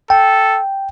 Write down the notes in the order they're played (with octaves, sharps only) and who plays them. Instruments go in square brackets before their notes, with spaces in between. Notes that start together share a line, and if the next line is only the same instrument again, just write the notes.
[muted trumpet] A4 [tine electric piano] G5